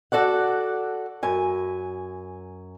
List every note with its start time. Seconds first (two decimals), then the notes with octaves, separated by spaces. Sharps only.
0.12 F#4 A4 D5 F#5
1.23 F#2 G#5